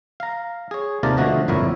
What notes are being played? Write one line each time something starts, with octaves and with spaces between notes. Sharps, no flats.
F5 A#5
G#4 C#5
D#2 C3 F4 A#4 D5 A5
B2 D3 F3 A3 F#4 D#5
G1 F2 A#2 E4 A#4 C#5